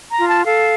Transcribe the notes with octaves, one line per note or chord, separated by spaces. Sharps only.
A#5
F4
A5
A4 F5